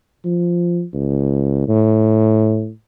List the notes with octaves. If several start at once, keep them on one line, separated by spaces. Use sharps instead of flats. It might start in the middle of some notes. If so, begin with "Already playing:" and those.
F3
C#2
A2